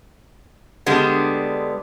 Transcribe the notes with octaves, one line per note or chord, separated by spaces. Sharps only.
D3 G3 G#3 B3 D4